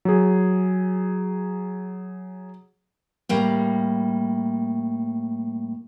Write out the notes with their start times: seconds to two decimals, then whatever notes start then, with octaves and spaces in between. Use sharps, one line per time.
0.05 F#3 G#4
3.29 A2 G3 A#3